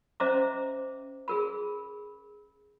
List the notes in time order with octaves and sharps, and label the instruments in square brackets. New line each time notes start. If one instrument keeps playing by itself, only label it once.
[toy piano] C#4 C5 D#5 E5 A#5 D6
G#4 A#4 B5